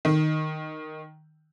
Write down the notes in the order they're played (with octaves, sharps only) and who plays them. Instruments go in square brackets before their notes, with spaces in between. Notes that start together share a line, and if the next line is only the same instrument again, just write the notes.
[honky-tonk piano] D#3